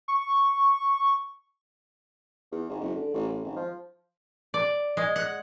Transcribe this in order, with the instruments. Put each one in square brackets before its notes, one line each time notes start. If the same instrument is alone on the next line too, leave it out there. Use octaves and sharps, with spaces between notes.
[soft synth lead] C#6
[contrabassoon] E2
G#1
F#1
D3
A1
A1
G#1
F3
[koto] D5
G#3
F#5